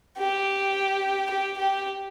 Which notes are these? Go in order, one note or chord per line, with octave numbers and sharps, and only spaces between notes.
G4
G4
G4